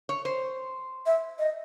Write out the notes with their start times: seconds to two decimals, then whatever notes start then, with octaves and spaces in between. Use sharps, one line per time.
0.09 C#5
0.25 C5
1.06 E5
1.39 D#5